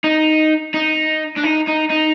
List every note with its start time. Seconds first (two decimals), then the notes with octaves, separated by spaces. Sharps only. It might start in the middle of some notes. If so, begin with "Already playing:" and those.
0.04 D#4
0.74 D#4
1.37 D4
1.43 D#4
1.67 D#4
1.90 D#4